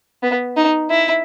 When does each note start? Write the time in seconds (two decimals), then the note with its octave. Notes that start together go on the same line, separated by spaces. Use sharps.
0.23 B3
0.57 D#4
0.90 E4